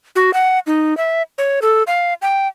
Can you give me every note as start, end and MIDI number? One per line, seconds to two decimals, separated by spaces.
0.16 0.33 66
0.34 0.59 78
0.67 0.96 63
0.97 1.22 76
1.38 1.60 73
1.62 1.83 69
1.87 2.14 77
2.22 2.48 79